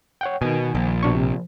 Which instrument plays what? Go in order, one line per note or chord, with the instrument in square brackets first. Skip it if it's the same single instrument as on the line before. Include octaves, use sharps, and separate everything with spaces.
[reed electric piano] C#5 F#5 G5
[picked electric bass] B2 [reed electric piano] D#3 G#5
[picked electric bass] A#1
[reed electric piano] B2 D4 C#6
C3